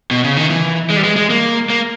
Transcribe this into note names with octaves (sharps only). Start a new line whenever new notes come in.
B2
C#3
D#3
E3
G#3
G3
G#3
G#3
A#3
A#3